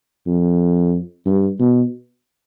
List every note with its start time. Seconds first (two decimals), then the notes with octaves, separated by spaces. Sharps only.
0.27 F2
1.26 G2
1.60 B2